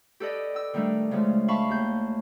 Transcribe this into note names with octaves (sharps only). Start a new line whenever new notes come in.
G4 A4 B4 D5 D#5
G5 E6
D#3 G3 A3 D4
C#3 F3 G#3 A3
E5 F5 A5 B5 C#6
D#2 G6